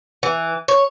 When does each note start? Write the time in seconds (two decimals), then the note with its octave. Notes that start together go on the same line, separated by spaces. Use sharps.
0.23 E3
0.68 C#5